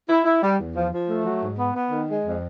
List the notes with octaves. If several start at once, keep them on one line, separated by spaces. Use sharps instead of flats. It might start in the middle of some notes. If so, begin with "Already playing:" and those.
E4
E4
G3
E2
F3
F3
A3
F#3
G#2
B3
B3
D#3
G#3
F2